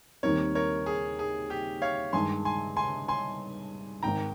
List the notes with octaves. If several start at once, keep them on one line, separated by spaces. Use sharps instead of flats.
D#2 D#3 G3 C4 A#4 C#5
A#4 C#5
G#4
G#4
G4
C#5 F5
G2 D#3 G#3 G#5 C6
G#5 C6
G#5 C6
G#5 C6
G#1 G#2 D#3 G5 A#5